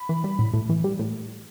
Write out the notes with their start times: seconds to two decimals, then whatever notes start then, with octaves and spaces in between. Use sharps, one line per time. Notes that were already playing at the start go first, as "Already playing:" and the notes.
Already playing: B5
0.09 E3
0.24 G3
0.39 A2
0.54 A2
0.69 E3
0.84 G3
0.99 A2